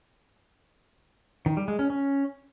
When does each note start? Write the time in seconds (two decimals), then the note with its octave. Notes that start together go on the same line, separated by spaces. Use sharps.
1.46 D#3
1.57 G3
1.68 G#3
1.79 C#4
1.90 C#4